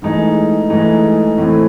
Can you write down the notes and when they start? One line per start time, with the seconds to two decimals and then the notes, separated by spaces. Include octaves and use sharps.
0.02 G#2 E3 A3 D#4 G#4
0.70 G#2 E3 A3 D#4 G#4
1.37 A2 E3 A3 C4